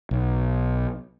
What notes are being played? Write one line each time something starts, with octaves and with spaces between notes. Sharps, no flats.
B1